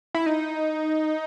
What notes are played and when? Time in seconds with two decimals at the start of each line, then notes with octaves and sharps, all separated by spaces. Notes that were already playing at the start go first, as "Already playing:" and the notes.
0.14 E4
0.26 D#4